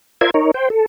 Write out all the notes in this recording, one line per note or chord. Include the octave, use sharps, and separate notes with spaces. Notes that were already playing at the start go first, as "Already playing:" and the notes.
F4 A#4 C5 D5 E5 G#6
D#4 A#4 C#5
C5 G5
A4